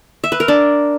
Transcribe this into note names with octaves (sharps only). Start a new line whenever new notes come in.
E5
B4
A#4
D4